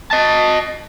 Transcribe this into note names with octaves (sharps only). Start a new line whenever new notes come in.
D#5 A5